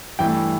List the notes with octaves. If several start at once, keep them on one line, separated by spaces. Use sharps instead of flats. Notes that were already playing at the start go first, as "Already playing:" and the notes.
G2 E3 A3 G5